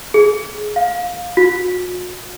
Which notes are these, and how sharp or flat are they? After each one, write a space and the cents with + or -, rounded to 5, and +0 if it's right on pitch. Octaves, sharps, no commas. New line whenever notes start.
G#4 +20
F5 +20
F#4 -45